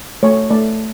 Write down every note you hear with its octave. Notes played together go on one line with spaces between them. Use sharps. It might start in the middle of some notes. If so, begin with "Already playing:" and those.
A3 C#5
A3 D5